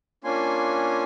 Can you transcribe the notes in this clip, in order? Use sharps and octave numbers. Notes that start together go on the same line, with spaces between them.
A#3 C#4 D4 F4 G#5 C6